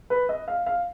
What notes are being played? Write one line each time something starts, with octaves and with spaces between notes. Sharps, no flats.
B4
D#5
F5
F5